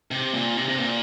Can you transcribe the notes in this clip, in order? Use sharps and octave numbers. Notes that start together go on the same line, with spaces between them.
C3
A#2
C3
C3
A#2